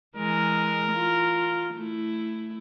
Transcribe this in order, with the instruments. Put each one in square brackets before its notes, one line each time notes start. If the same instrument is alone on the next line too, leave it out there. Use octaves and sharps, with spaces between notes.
[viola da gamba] E3 G#3 [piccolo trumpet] A#4
[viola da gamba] F4
A3 E4